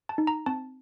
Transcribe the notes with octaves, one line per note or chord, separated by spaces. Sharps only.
A5
D#4
A#5
C4 A5